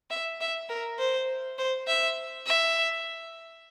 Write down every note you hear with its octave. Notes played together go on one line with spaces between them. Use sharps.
E5
E5
A#4
C5
C5
E5
E5